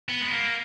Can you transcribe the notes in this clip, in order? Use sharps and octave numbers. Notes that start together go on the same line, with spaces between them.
B3
G#3
A#3